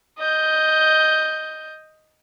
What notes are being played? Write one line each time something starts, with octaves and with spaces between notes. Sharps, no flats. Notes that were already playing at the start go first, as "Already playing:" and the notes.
D#5 G6